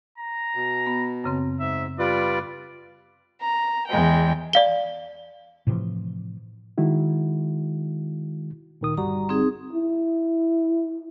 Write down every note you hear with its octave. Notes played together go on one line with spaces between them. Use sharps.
A#5
B2
B3
F#2 C#3 C4
G#2 E5
G3 F4 B4 D5
A#5
E2 G#3 G5
D5 F5 G7
A2 C3 E3 F3
D#3 G#3 E4 F#4
A#2 D#3 D#6
G1 G3 F#4 A#5
C4 D#4 G#4
E4